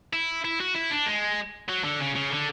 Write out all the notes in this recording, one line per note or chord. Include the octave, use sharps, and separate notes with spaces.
E4
E4
F#4
E4
D4
G#3
F#3
D3
C#3
C#3
D3